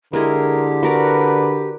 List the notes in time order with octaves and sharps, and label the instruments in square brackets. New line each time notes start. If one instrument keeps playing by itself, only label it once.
[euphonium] D3 [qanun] G#3 E4 G#4 [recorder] G4 [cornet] A#4
[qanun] F#4 A#4 D5 [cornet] B4